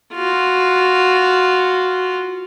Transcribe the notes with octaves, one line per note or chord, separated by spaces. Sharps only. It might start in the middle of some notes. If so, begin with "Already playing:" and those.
F4 F#4